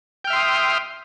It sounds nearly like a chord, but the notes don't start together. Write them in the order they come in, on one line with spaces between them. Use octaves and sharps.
G5 F6 E5 C6 D#6